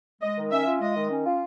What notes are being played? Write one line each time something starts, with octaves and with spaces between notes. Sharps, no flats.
G#3 D#5
D#3
C#4 E5
F4
G#3 D#5
D#3
C#4
F4